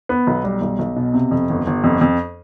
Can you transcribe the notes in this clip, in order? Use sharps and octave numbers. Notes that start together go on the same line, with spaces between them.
B3
B1
G3
B1
B1
B2
C3
F2
G1
G1
F2
F2